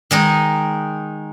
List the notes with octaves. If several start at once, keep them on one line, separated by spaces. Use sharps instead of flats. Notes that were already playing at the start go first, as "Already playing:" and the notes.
D#3 G#3 D#4